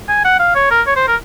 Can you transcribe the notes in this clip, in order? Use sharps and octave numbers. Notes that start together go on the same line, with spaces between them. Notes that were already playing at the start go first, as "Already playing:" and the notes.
G#5
F#5
F5
C#5
A#4
C#5
C5
A#4